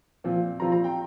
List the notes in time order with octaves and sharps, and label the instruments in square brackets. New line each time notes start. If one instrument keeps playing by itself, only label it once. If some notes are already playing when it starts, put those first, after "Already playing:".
[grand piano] A#2 F3 C4 F4
A#2 F3 C4 F4 A#5
A#5
G5